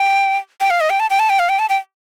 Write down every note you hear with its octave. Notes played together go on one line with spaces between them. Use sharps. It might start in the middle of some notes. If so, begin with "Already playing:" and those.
Already playing: G5
G5
F5
D#5
G5
A5
G5
A5
G5
F5
G5
A5
G5